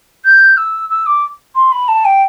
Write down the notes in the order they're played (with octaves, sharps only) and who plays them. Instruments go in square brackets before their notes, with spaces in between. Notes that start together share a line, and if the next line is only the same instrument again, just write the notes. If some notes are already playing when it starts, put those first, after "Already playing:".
[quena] G6
E6
E6
D6
C6
B5
A5
G5